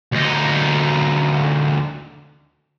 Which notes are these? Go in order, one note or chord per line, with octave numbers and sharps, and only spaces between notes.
D2 D#4